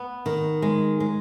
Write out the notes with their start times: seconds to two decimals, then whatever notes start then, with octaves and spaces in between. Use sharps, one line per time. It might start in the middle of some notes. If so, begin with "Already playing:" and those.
Already playing: B3
0.26 D#3
0.62 G#3
1.00 G#3